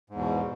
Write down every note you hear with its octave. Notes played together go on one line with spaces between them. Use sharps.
E2 G#2 B2